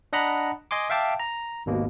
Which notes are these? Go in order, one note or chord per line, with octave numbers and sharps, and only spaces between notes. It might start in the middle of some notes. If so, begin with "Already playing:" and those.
D4 D#5 F#5 A#5 B5
D#5 G#5 C6 D6
E5 F5 G5 A5 D6
A#5
G#1 D#2 B2 A#3